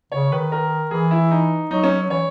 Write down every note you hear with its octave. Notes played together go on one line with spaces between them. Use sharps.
C#3 C#5
D#3 B4
A#4
E3 G#4
E4
D#4
F#3 D#4
C#4
E3 C#5